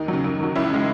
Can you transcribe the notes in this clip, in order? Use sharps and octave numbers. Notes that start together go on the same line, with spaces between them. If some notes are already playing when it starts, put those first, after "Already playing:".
Already playing: D#2 D#4
C#3 F#3
F#2
D#3 F#3
C#2 C#4 E4
C#3 G#3